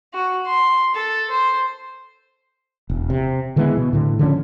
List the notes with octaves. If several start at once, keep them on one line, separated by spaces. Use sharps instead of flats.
F#4
C6
A4
C5
E1
C3
D3 E3 G#3 B3
B2
A2 D3
D3 F3 G#3 C#4